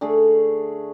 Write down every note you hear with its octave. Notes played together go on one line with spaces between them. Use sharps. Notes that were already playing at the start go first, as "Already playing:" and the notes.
D3 A3 G#4